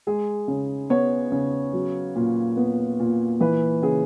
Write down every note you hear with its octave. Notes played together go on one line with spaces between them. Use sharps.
G#3 G#4
C#3
B3 C#5
C#3
F#3
A#2
B3
A#2
E3 B4
C#3 G#4